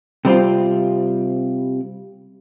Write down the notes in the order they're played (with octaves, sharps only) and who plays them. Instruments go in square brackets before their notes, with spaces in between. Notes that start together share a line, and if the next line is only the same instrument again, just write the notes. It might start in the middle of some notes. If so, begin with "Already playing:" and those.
[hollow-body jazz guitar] C3 G3 C4 F4